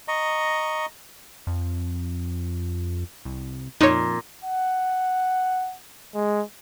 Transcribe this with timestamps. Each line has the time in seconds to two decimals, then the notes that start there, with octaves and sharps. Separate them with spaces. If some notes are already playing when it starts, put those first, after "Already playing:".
0.08 D#5 A#5 C#6
1.47 F2
3.25 C2
3.81 F2 A#2 D#4 C#5
4.44 F#5
6.15 G#3